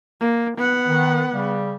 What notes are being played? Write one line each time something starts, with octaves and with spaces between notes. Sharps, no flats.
A#3
B3 F#5
D#3
C#3 G3